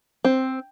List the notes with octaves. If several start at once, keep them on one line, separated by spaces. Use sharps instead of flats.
C4